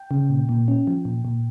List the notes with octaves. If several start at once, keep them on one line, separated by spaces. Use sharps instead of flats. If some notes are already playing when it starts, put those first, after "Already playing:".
Already playing: G5
C#3
A#2
A#2
C#4
F3
A#2
A#2